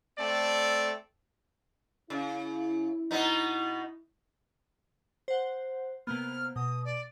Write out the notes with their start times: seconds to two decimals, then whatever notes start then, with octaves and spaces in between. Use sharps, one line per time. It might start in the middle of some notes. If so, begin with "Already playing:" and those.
0.19 A3 C4 A4 D5
2.10 C#3 E4
3.11 B2 B3 D#4
5.28 C5 F#5
6.07 C3 A#3 B3 F6
6.56 B2 D#6
6.85 D5